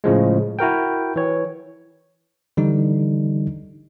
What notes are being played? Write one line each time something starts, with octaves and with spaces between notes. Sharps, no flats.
A2 C#3 F3 G#3
E4 F#4 A#4 G5
E3 C#5
D3 E3 G3 D#4